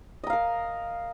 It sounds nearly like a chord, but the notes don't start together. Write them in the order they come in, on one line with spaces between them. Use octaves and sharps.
D#5 A#5 F5 A#4